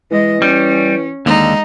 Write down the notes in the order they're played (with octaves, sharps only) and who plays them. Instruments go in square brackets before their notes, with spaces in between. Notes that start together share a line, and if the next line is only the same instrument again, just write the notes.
[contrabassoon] E3 [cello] G#3 D#5
[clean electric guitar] G3 [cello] C#4
[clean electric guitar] D#2 D3 [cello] G#3 [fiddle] D#4